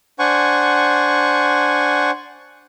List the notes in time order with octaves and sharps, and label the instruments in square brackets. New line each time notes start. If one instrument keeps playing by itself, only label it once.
[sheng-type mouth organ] D4 C5 F#5 G#5 C#6